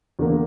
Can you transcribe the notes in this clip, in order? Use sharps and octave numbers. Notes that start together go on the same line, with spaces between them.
E2 D3 A#3